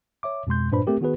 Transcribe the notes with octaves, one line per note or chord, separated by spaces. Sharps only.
C#5 E5 D6
F2 B2 G#3 C6 G6
G2 A#2 D4 B4 C5 B5
A3 C4 G4 A#4
D#3 B3 F#4 G#4 B4